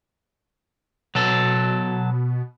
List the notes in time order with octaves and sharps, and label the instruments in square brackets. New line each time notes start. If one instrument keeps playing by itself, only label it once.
[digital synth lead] B2 [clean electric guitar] F#3 A4